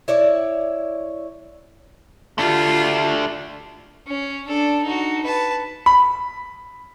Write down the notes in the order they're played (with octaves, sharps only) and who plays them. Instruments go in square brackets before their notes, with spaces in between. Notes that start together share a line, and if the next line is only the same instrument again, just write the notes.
[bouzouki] E4 C#5 D5
[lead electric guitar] A3 D4 [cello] F4 G4
[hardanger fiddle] C#4
D4 A4
D#4 F#4
B4 A5
[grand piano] B5